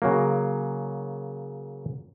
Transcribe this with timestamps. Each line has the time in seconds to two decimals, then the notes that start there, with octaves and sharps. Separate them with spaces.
0.02 C#3 F#3 A#3